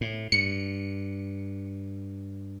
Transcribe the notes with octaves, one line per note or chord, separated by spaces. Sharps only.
A2
G2 C#7